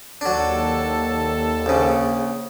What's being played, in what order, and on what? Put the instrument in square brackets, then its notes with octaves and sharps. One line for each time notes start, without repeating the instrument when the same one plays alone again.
[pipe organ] D#2 A4 [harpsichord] F#3 D4
[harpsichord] A#1 C#3